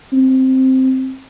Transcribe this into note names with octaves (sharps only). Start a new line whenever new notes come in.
C4